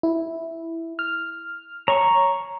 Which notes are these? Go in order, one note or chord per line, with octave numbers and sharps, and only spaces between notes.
E4
F6
C#5 A#5 C#6